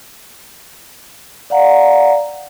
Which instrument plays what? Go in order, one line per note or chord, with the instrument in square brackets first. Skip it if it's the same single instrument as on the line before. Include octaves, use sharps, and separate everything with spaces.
[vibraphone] D5 F5 F#5 A#5